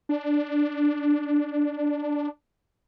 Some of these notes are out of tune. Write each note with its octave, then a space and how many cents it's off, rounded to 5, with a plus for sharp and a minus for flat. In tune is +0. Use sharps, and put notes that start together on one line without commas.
D4 +0